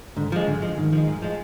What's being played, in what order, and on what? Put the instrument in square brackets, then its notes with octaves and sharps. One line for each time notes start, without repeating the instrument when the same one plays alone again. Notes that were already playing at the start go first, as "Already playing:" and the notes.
[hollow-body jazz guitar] G#2 [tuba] D3
[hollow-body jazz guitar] F3 G#3
[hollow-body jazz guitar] G#2 [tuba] D3
[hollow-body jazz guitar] F3 G#3
[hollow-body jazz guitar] G#2 [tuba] D#3
[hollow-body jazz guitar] F3 G#3
G#2
F3 G#3